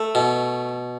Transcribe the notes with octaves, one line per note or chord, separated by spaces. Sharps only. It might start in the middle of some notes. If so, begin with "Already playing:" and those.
Already playing: A3
B2